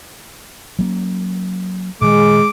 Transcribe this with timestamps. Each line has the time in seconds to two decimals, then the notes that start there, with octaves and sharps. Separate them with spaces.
0.79 F#3 A#3 C#4
2.02 A#2 D#3 G#3 D6